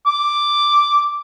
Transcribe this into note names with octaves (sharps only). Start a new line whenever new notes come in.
D6